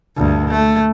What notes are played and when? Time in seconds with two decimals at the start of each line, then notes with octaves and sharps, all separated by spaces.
0.17 D2 G2
0.48 A3